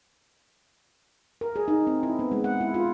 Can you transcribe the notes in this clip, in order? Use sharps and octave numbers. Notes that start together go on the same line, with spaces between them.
A#4
G#4
D#4
C4
E4
B3
G#3
F#5
E4
F4